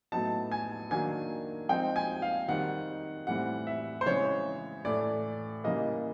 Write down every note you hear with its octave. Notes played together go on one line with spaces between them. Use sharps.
A2 F#3 B3 D#4 A5
G#5
D#3 F#3 A#3 D4 G#5
F3 G#3 C4 D#4 G5
G#5
F5
D#3 G3 C4 D#4 F#5
A2 E3 G3 C4 F#5
E5
C5
C#3 E3 G#3 C4 C#5
A2 E3 A3 D5
C#3 E3 G3 A#3 D#5